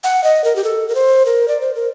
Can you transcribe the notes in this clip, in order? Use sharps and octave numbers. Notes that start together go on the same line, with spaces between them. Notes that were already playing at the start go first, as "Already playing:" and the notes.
F#5
D#5
A#4
G4
A4
A#4
C5
A#4
D5
C5
A#4